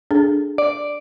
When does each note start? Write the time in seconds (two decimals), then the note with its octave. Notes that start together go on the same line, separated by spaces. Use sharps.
0.11 D4 G#4 A4
0.58 D5